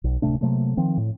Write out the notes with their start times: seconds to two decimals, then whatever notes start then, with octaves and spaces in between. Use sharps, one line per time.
0.04 B1
0.22 D1 C3 A3 D4
0.41 C3 F#3 A3 A#3
0.77 D#3 F3 C4
0.97 A2